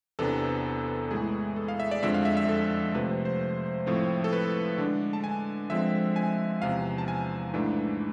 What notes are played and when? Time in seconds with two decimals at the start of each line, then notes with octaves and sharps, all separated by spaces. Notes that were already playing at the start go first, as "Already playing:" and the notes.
0.19 E2 C3 E3 B3 D4 A4
1.11 A2 E3 G#3 G#4
1.56 A4
1.68 F5
1.80 E5
1.91 D5
2.02 F2 D3 F3 G#3 E5
2.14 F5
2.25 E5
2.37 E5
2.49 A4
2.94 C3 F3 A3 B4
3.10 C5
3.25 C5
3.86 A2 F3 A3 C4
4.24 A4
4.33 B4
4.78 D3 G#3 D4
5.13 A5
5.24 G#5
5.70 D3 F3 G#3 C4 E5
6.16 G#5
6.62 E2 C3 F3 F5
6.98 A5
7.08 G#5
7.54 G#2 E3 A3 D4